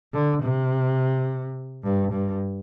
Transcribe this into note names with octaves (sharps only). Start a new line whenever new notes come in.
D3
C3
G2
G2